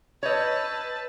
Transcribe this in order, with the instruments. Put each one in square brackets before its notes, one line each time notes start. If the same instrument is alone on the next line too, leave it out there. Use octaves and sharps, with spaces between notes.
[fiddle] B4 A5 [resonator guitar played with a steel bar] C#5 D#5 [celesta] E6 G6 G#6